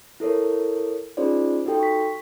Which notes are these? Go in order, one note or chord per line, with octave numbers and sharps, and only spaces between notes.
E4 A4 A#4 C#5
C#4 D#4 F4 G#4 C5 D5
D#4 F#4 G4 A4 G5
C#6 B6